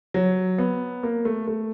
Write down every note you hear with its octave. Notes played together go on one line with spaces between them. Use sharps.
F#3
B3
A#3
A3
A3